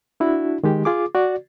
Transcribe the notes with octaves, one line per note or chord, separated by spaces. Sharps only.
D4 E4 F#4
D#3 G#3 G4
F4 G#4 D6
F#4 D5